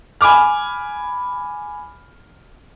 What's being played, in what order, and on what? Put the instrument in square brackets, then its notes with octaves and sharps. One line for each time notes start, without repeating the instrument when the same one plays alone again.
[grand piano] G#5 B5 D6 F6